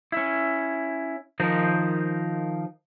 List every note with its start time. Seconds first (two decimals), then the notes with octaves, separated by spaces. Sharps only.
0.12 C#4 E4
1.40 D#3 F3 D#4 A#4 C5